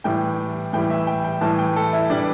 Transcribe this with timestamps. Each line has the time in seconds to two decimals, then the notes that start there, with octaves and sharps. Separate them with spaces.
0.04 A2 E3 G3 G5
0.73 A2 E3 G3 G5
0.90 E5
1.07 G5
1.25 G5
1.41 A2 E3 G3 A5
1.59 G5
1.76 A4
1.93 E4
2.10 E3 G3 D4